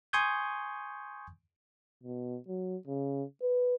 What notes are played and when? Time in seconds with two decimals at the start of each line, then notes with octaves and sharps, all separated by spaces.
0.13 G#5 C6 C#6 D#6 G6 G#6
2.03 B2
2.48 F#3
2.87 C#3
3.42 B4